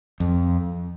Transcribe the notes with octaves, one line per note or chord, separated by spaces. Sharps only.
F2